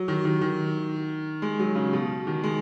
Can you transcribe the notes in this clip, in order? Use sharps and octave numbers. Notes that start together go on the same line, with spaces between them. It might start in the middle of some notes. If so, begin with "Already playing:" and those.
Already playing: F#3
D#3
D#3
D#3
G#3
F#3
C#3
B2
D#3
G#3